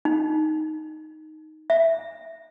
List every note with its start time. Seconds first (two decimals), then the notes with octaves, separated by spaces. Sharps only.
0.05 D#4
1.70 E5